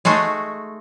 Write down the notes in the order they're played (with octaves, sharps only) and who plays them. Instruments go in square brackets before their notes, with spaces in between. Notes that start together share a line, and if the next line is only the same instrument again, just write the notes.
[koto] G#3 A3 D#4 F#4